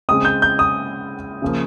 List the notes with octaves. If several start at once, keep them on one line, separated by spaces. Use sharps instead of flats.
C#3 G#3 C4 D#6
G6
G6
D#6
C#3 F3 A#3